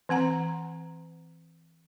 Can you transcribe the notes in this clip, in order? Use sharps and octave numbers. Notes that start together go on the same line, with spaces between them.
E3 C4 F#5 A#5